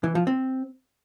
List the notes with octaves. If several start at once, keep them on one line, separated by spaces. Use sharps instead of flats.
E3
F3
C4